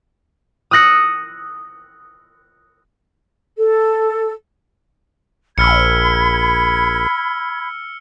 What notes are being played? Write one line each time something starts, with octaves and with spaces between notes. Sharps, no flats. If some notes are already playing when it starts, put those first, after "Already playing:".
D#6 E6 F#6 A#6 C#7
A4
A#1 B5 E6 F6 G#6 C#7